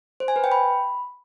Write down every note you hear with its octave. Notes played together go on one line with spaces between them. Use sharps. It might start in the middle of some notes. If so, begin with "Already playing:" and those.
C5
G#5
B4
G5
B5